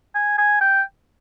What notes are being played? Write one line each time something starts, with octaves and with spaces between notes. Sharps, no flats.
G#5
G#5
G5